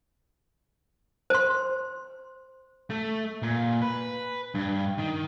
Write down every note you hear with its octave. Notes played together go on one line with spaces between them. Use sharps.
C5 C6
A3
A#2
B4
G2
D#3